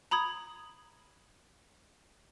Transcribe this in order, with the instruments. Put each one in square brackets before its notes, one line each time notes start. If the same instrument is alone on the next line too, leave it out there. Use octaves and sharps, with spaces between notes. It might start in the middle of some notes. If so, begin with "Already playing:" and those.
[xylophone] A#5 B5 D#6 G#6